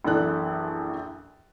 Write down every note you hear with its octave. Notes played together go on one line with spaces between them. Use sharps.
A#1 F#2 E3 A4 D5 F#6